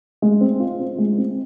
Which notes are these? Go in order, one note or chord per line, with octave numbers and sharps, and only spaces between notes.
G#3
C4
F4
C4
G#3
C4